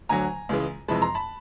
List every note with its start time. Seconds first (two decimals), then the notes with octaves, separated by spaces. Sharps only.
0.09 D2 D3 F#3 G#5 A#5
0.49 C#2 C#3 E3 G#3
0.88 F2 C3 E3 G#3 A5 B5
1.02 A#5 C6
1.15 A5 B5